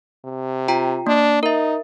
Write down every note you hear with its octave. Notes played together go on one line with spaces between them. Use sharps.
C3
F4 G5 A#5
A#3 D4
D#4 A#4 E5